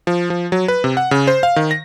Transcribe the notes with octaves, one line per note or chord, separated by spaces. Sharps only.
F3
F3
F#3
B4
C3
F#5
C#3
C5
F5
D#3
A#6